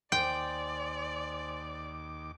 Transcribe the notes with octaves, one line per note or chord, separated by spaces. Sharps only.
D#2 C5 D5 G5 G#5 C6 D6